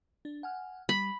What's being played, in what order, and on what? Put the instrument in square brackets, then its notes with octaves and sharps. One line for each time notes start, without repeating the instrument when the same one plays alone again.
[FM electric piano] D4
F#5 G#5 F6
[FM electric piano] G3 [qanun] B5